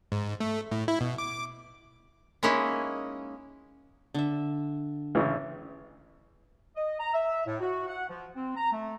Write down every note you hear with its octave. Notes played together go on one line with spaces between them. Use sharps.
G#2
A3
A2
E4
B2
D6
G#3 A#3 C#4 D#4 E4
D3 E5
A1 C#3 E3
D#5
A#5
E5
A2
F#4
F#5
F3
C4
A#5
A3